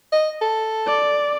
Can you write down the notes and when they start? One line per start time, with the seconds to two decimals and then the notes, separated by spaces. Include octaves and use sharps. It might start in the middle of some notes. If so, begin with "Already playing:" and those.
0.12 D#5
0.41 A4
0.87 D5